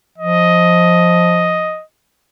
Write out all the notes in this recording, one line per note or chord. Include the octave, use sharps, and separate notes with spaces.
F3 D#5